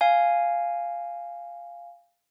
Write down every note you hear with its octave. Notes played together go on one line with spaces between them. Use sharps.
F5 G#5